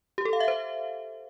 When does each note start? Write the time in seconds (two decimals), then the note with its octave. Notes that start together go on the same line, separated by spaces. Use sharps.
0.18 G4
0.25 A4
0.33 F5
0.40 E5
0.48 C5